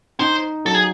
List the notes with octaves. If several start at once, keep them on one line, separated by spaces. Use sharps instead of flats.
D#4 C5
F#3 A4
G#4